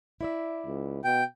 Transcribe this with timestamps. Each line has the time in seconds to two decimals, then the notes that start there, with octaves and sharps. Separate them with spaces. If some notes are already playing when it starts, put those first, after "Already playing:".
0.21 E4 D5 E5
0.66 C#2
1.04 B2 G5